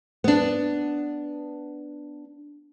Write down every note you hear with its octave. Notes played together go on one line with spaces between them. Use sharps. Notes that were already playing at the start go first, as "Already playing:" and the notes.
B3 D4